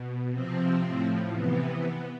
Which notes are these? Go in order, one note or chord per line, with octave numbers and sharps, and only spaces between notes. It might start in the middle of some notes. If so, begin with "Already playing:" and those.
Already playing: B2
C3 F3 C4
A2 F3
C3 E3 B3